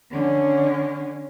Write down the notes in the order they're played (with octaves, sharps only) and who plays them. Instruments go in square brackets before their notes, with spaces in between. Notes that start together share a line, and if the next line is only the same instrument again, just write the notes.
[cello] D3 C#4